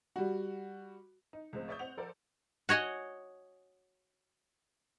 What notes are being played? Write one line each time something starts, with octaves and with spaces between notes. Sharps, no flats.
G3 F#4
D#4
C#2 A2 C#3 F3 C4
C#5 D5 E5 C#6 D#6 G6
C4 F#5 F7
F3 A4 A#4 C5 D5
F#4 C#5 D#5 F#5 G#5